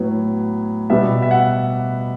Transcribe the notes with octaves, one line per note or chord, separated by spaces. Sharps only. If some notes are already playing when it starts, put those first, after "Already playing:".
Already playing: A2 F#3 B3
B2 G3 B3 E5
E5
F#5